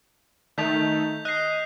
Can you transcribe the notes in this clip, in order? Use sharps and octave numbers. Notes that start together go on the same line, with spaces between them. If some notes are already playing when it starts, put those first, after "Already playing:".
D#3 A3 G6 B6 F7
D#5 F#6 C7